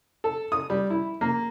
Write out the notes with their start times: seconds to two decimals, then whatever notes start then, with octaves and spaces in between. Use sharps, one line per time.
0.24 A4
0.52 D#6
0.70 G3
0.90 E4
1.21 A#3